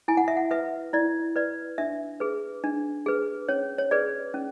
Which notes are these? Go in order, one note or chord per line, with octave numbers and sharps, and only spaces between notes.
E4 G#5
F#5
E5
F#5
B4 E5
E4 D5
B4 D5
D4 E5
G#4 B4
D4
G#4 B4
C#4 C#5
C#5
G#4 B4 D5
C#4